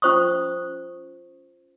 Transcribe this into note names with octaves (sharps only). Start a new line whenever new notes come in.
C#4 F4 C5 C#6 D#6